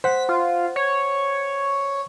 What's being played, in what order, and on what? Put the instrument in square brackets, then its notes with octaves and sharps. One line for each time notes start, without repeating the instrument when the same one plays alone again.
[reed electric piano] C5 F#5 [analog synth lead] B6
[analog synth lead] F4
C#5